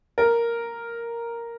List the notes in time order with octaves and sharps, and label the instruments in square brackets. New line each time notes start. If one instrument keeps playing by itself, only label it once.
[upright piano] A#4